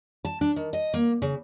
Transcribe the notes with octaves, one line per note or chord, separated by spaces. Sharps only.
A5
D4
D#3
D#5
A#3
C#3